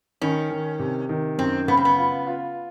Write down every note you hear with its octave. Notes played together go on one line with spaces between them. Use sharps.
D#3 C#4
D#3
C3
D#3
F#2 C4
C#3 B3
C4
B3
F4
F4